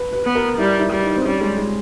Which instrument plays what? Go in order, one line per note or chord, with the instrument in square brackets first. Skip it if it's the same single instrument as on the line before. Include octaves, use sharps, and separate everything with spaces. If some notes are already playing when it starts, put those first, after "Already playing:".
Already playing: [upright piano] B4
B4
[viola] B3
[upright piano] A#4
[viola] G3 [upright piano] E4
[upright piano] E4
[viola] G3
[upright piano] D#4
C4
[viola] G3 [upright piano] C#4
[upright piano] G#3
G#3